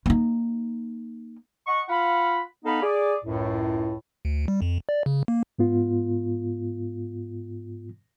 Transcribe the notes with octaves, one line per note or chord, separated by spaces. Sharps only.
A#3 D#4
D#5 F#5 C#6
F4 F5 F#5 B5
B3 D#4 A4 F5 B5
G#4 D5
C#2 F#2 A2
D2
G3
F2
D5
C#3
A#3
G#2 B3 F4